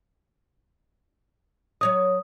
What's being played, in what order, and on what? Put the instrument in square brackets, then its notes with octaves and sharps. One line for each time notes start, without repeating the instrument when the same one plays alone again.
[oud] F#3 C#5 D#5 [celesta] D#6